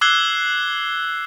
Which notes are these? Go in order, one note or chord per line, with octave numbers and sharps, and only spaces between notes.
D6 E6 F#6 G#6 C7 G7